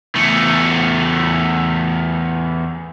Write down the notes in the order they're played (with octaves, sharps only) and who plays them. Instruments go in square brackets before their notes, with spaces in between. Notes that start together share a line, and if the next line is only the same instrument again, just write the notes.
[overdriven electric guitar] E2 A3